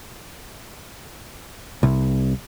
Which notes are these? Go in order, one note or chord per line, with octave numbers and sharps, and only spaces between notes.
C2